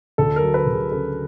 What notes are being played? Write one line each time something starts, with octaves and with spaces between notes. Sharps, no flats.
D2 A4
A#4
F#3
B4
D2
G#4
C#3 A4